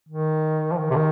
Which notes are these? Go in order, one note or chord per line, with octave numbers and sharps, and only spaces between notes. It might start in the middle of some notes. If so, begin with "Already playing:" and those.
D#3
F3
D#3
C3
D#3